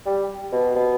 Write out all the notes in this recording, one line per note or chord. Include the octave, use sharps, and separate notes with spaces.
G3
B2
B2